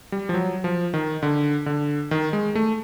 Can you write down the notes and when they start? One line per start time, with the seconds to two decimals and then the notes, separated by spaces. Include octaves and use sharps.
0.12 G3
0.29 F3
0.34 F#3
0.64 F3
0.94 D#3
1.23 D3
1.66 D3
2.11 D#3
2.33 G#3
2.55 A3